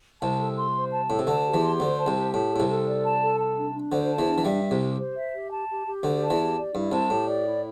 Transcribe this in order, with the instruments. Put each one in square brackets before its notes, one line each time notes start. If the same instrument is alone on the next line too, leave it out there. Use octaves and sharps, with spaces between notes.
[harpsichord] C2 C3 [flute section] A5
[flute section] A4
C6
C5
A5
[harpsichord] A2 [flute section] A4
[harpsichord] C3
[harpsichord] D2 D3 [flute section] A5
[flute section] G4
[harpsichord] E2 E3
[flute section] C6
[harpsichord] D2 D3 [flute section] C5
[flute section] A5
[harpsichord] C2 C3
[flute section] G4
[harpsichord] A2 [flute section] A5
[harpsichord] A2 [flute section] A4
[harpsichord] C2 C3
[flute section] A4
D5
A5
A4
A5
D4
D4
[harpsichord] D2 D3 [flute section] C5
[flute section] A5
[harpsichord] E2 E3
[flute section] D4
[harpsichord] E3
[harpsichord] G2 G3 [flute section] E5
[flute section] G4
[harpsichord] C2 C3
[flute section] G4
C5
E5
G4
A5
G4
G4
[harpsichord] D2 D3 [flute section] D5
[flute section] A5
[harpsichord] E2 E3
[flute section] G4
D5
[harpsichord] G2 [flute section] E4
[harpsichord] C2 C3 [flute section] A5
[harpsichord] A2 [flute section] G4
[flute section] D5
E4